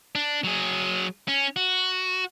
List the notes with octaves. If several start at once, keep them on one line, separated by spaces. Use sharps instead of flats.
D4
F#3 G#4
C#4
F#4